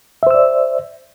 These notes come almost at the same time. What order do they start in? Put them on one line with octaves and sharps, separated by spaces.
E5 C5 E6 D5